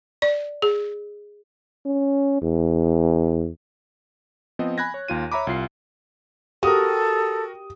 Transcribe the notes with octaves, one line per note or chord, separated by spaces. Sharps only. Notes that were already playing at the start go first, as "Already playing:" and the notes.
D5
G#4
C#4
E2
F3 B3 C4 D#5
G#5 B5 F#6 G#6 A#6
C#5
D#2 F4 D#7
C#5 E5 A#5 B5 D6
C2 F4 C7
F#4 G4 A4 A#4 D#6